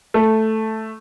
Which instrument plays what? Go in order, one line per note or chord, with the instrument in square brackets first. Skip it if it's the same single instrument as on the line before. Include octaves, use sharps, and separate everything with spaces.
[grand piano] A3